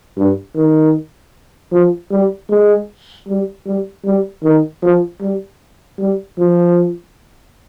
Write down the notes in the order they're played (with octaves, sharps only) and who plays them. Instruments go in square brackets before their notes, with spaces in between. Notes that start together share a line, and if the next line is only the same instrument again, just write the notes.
[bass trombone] G2
D#3
F3
G3
G#3
G3
G3
G3
D#3
F3
G3
G3
F3